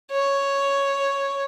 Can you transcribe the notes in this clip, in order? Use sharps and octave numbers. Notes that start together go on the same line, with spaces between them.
C#5